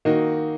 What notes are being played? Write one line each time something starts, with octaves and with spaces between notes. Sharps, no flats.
D#3 A#3 D#4 F#4